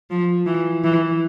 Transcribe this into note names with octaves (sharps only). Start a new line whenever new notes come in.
F3
E3
E3